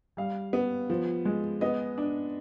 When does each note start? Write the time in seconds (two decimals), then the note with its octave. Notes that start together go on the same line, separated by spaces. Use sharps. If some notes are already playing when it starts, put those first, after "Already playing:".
0.17 G3 F5
0.53 B3
0.90 F3
1.25 G#3
1.61 B3 D#5
1.98 D4